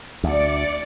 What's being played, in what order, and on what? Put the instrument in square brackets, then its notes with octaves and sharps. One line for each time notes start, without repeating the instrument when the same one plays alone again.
[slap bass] D2 [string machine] D5 C#7